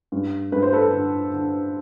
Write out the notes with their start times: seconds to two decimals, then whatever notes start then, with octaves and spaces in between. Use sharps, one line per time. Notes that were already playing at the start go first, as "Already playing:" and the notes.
0.12 G2
0.52 G2 B4
0.62 C5
0.73 A4 B4
0.93 D3
1.33 D3